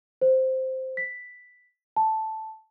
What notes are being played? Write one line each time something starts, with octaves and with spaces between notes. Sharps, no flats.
C5
B6
A5